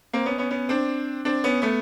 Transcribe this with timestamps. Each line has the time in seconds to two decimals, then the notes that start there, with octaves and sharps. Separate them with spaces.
0.13 A#3 C4
0.26 B3 C#4
0.38 B3 C#4
0.51 B3 C#4
0.69 C4 D4
1.25 C4 D4
1.44 B3 C#4
1.62 A3 B3